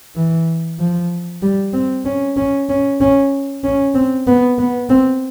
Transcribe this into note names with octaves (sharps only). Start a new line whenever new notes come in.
E3
F3
G3
C4
C#4
C#4
C#4
C#4
C#4
C4
B3
B3
C4